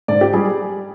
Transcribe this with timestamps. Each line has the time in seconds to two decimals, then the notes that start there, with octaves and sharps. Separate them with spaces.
0.08 G#2 D5
0.21 G4
0.33 G3 G#4